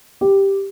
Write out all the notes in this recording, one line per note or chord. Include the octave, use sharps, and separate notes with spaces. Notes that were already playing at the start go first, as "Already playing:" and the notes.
G4